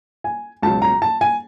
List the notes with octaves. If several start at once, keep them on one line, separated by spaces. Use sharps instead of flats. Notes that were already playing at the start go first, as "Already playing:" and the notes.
G#5
C#2 B2 F#3 A5
A#5
A5
G#5